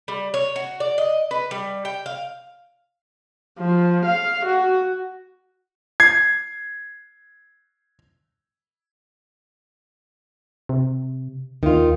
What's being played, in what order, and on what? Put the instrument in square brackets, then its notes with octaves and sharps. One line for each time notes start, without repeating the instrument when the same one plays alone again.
[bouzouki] G3
C#5
F#4
D5
D#5
B4
G3
G5
F5
[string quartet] F3
F5
F#4
[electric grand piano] G#6 C7
[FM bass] C3
[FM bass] D#2 [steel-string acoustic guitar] D#3 F4